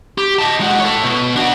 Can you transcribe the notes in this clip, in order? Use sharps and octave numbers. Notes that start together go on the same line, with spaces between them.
G4
D#5 A5
G#3 F#4
A4 C#5
B2
D4 F#4